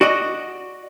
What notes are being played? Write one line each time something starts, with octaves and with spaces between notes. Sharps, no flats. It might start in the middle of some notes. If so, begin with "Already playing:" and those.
F#4 D5 D#5